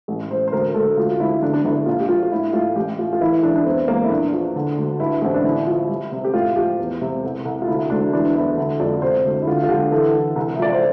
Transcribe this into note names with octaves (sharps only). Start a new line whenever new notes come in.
A1
A1 C5
C5
D2 A#4
D2 A4
D2 F4
F4
D2 E4
G1 D4
D4
G1 E4
A#1 F4
G4
F3 F4
F4
A2 E4
A2 F4
A1 G4
A2 F4
F4
E3 E4
E3 D4
D4
E2 C4
E2 A#3
E4
A#1 D4
F3
D3
D2
G2 E4
A1 C4
D4
D3 E4
F3
G3
C3
G4
A2 F4
F3 G4
E2
C3
C2
C2
F4
D2 E4
D2 D4
E3 D4
E2 E4
D3 E4
F2 D5
C3 C5
D2
E4
D3 F4
F4
D3 G4
E3 A4
E3
C2
E5
F3 D5
C5